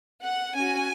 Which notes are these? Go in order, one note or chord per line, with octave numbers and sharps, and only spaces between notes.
F#5
C#4 F#4 G#5